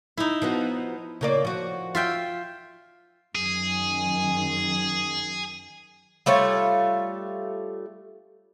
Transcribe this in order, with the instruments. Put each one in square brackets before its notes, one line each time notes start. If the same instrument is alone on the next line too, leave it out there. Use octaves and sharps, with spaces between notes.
[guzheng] D#4 E4
[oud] F3 B3 F#4
C#3 A#3 D5
F3 F#4
[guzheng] F4 E5 G5
[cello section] F#2 D#3 [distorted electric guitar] G#4
[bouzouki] G3 A3 F4 C#5